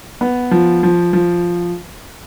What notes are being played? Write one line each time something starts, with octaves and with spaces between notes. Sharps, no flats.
B3
F3
F3
F3